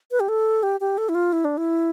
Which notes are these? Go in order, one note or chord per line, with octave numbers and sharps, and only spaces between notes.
B4
G4
A4
G4
G4
A4
E4
F4
E4
D4
E4